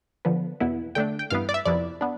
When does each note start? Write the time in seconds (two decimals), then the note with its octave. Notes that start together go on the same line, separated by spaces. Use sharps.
0.25 D3 F3 B3
0.60 E2 B2 B3 E4
0.95 D3 A3 D4 G5
1.19 G5
1.30 G2 E3 B3 F5
1.49 D5
1.54 E5
1.65 F2 C3 F3 B3 E4 D5
2.01 B3 D4